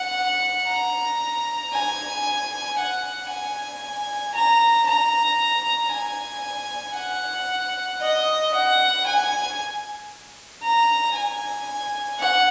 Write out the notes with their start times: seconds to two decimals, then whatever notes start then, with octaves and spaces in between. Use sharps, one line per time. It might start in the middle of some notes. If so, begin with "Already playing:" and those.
Already playing: F#5
0.68 A#5
1.73 G#5
2.78 F#5
3.30 G#5
4.35 A#5
4.87 A#5
5.92 G#5
6.97 F#5
8.01 D#5
8.54 F#5
9.06 G#5
10.63 A#5
11.15 G#5
12.20 F#5